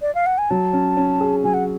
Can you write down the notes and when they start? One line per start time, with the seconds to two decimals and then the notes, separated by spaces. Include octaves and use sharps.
0.02 D5
0.15 F5
0.26 F#5
0.38 G#5
0.50 F#3 A5
0.73 C#4
0.97 C#4
1.21 G#4
1.44 F#3 G#5
1.54 F#5